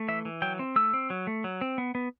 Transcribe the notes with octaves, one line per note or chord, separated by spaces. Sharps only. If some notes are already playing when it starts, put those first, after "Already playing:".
Already playing: A3
E3 E5
E3
F#3 G5
C4
A3 E6
C4
F#3
A3
F#3
C4
B3
B3